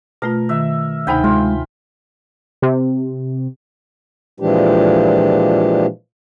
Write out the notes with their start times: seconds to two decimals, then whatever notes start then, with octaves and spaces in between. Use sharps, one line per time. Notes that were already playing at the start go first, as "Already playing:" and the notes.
0.22 B2 A3 F4 A#4
0.49 D#3 E5
1.07 D2 C3 D#4 G5 G#5 B5
1.24 G#3 F4
2.62 C3
4.40 A#2 E3 F3 G#3 D4 G4